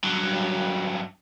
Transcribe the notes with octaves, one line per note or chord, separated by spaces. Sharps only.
G2 F#3